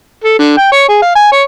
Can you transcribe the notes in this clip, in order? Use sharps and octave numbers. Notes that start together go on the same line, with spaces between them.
A4
D3
G5
C#5
G#4
F5
G#5
C#5